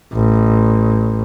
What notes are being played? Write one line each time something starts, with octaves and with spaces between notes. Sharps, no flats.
A1